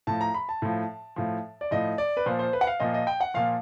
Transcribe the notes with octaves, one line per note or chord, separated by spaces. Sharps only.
A2 F3 A5
A#5
B5
A5
A2 F3
A2 F3
D5
A2 F3 D#5
D5
B4
A#2 F3 C5
C5
B4
F#5
F5
A#2 F3 D#5
D#5
G5
F#5
A#2 F3 F5